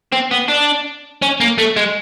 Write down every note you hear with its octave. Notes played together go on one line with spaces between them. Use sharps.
C4
B3
D4
C#4
A#3
A3
G#3